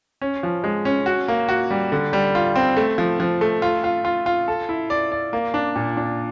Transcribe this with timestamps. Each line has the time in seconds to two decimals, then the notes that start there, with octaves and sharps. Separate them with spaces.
0.21 C#4
0.43 F3
0.64 G#3
0.85 C#4
1.06 F#4
1.28 A#3
1.49 F#4
1.70 G3
1.92 D3
2.13 G3
2.35 F4
2.56 C4
2.77 A3
2.98 F3
3.20 F3
3.41 A3
3.62 F4
3.84 F4
4.05 F4
4.26 F4
4.48 A4
4.69 E4
4.90 D5
5.12 D5
5.33 A#3
5.54 D4
5.76 A#2
5.97 D4